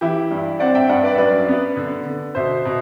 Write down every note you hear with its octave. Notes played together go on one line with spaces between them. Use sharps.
E3 E4 G4
G2
C4 D5 F#5
E5 G5
G2 D5 F#5
B4 D5
E5
F#2 B4 D5
B3
D3
D3
B2 C5 E5
B2